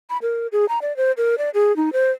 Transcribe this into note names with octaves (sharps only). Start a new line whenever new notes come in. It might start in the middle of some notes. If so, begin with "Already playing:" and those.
B5
A#4
G#4
A#5
D5
C5
A#4
D5
G#4
D#4
C5